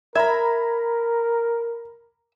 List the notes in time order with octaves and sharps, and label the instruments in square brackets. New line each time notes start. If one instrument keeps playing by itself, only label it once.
[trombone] A#4 [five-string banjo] E5 [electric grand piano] A#5 B5 G#6